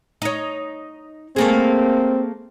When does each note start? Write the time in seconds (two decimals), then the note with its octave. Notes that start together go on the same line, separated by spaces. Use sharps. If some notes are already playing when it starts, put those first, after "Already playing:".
0.22 D#4 C#5
1.36 A3 A#3 C4 G#4